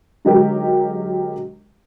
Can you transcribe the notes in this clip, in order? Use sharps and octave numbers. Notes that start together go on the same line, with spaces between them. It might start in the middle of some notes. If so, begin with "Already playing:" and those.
D3 F#3 G#3 D#4 G4 A#4